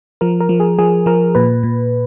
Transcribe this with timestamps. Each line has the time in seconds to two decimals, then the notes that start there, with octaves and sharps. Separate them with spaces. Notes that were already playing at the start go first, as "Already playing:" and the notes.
0.21 F3 A#4
0.41 A#4
0.49 F3
0.60 G#4
0.79 F3 G#4
1.06 F3 A#4
1.35 A#2 B4
1.63 A#2